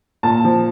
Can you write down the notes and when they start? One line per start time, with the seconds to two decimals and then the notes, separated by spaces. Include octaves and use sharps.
0.23 A#2 A5
0.44 F3